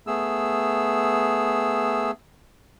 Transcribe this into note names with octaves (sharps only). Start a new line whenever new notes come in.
A3 B3 G#4 E6